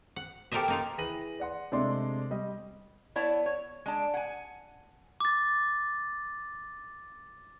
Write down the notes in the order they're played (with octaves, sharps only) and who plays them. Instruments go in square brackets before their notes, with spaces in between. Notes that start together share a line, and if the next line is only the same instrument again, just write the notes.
[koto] F#5
G4 A4 A#4 C5 D#5 E5
A#3 D#4 F4
[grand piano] E3 G#4 B4 A#6 D#7 F#7
D5 F#5 C6
C3 G#3 A3 D4 D5 C6
G3 D#5
[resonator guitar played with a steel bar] B3 E4 C#5 D5 A5
C#5
G#3 D4 A5
F#5 G#5
[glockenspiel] D6 A6